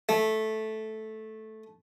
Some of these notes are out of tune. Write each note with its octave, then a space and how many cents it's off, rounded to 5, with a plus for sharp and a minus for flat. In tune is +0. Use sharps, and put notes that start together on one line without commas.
A3 -10